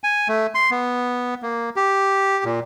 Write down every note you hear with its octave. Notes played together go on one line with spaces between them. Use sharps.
G#5
A3
C6
B3
A#3
G4
A#2